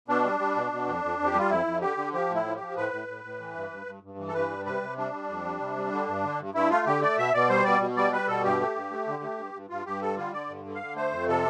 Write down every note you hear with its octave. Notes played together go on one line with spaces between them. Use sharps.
B2 D4
G3
G3
B2
B2
F2
F2
F2
G4
G3 F4
F2 E4
F2
D3 G4
D3
F3 G4
A2 E4
F3
G4
F3
A2 B4
A2
A2
A2
E3
G2
G2
G2
G2
E3
A4
G2 B4
G3
C3 B4
C3
G3 D4
G3
F2
G3
C3
G3
D3
G2
D3
G2
G2 E4
A3 F4
D3 G4
A3 D5
B2 E5
B2 D5
G3 C5
B2 D5
B2
G3 D5
G3 B4
B2 A4
G2 G4
A3
G2
A3
D3
A3
G2
G2
G2 F4
G2 G4
G3 A4
D3 F4
D3 D5
G2
D3
F5
D3
A3 C5
F2
C3 A4